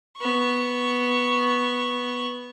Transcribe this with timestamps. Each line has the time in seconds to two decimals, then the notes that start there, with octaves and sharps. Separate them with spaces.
0.17 B3 C#6